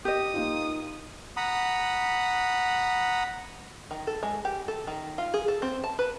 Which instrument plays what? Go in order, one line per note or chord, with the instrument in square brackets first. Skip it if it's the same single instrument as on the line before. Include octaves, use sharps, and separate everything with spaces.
[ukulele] G4 D#5 [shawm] D#6
[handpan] A#3 D#4 F4
[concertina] F#5 A#5 B5 D#6
[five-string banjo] D#3
A4
G#3
G4
A4
D#3
F4
G#4
A4
C4
A5
B4